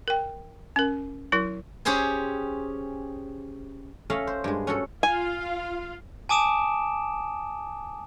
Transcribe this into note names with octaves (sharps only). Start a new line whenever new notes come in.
A#4 G5
C#4 A#4
F#3 E4 A#4
C#4 G4 G#4 C5 G#5
A3 C#4 A4 D#5 F5
C5
G2 G#3
C#4 F#4 A4
F4 F5 G#5
G#5 A5 D6 D#6 D7 E7